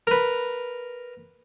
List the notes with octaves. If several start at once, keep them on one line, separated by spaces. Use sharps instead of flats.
A#4 B4